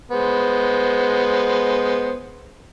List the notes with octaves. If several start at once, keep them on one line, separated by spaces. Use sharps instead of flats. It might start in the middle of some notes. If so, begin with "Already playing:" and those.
G#3 B3 C5